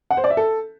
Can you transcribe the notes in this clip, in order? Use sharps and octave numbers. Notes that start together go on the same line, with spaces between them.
F#5
C5
D5
E5
A4